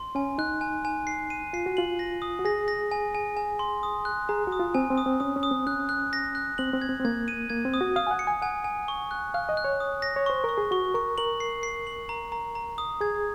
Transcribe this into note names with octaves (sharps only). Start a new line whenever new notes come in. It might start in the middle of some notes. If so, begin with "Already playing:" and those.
Already playing: C6
C#4 G#5
D#4 F#6
G#5
G#5
C7
D#7
F4 C7
F#4
F4 F#7
A#6
D#6
F#4
G#4 A#6
A#6
G#5
G#5
G#5
C6
D#6
F#6
G#4 A#5
F#4
D#6
F4
C4 G#5
C4
D#6
C4
C#4 D#6
C#4
D#6
C4
C#4 F#6
F#6
A#6
F#6
C4 F#7
C4
G#6
C4
C4
A#3 G#6
D#7
A#3 G#6
C4
D#6
F#4
F5 D#6
G#5
F#5
C#7
G#5
F#5 G#5
G#5
C#6
F#6
F5 F#6
D#5
F#6
C#5
D#6
A#6
C#5
C5 C#6
A#4 C#6
G#4
F#4 C#6
A#4 C#6
A#4 F#7
C7
C7
F#7
A#5
A#5
A#5
D#6
G#4 G#6